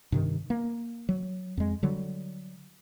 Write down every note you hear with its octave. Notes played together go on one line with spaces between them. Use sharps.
G2 C3 D#3
A#3
F#3
F2 G#3
D3 F#3 G3